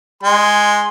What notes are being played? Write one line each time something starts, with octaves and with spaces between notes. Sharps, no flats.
G#3 C6